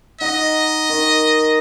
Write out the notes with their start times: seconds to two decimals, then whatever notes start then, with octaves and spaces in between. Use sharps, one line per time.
0.21 D#4 D#5 F#5
0.89 D#3